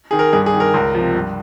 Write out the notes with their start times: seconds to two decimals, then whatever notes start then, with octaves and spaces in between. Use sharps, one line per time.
0.11 D#3 G#4
0.19 A#4
0.33 G2 G#4
0.46 G#4
0.54 D#3
0.60 A#4
0.74 C#2
0.95 C3 F3
1.15 G2